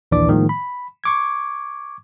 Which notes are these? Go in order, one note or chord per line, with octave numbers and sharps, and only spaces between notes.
A#1 D#2 E3 D4 D5 D6
A2 D#3 F3 G#3 A#3
B5
C#6 D6 G#6